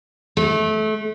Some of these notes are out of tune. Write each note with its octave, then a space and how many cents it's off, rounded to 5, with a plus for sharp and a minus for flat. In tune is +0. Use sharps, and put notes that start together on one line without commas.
A3 -25